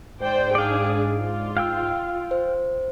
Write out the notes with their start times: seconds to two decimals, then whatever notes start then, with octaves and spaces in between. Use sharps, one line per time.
0.21 G#2 C5 D5 G5
0.55 D4 G#4 D5 F5
1.17 F4
1.57 F5 G5 E6
2.31 C5